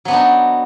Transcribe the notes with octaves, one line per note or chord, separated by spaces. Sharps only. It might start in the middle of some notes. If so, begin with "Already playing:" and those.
F#3 B3 D4 D#4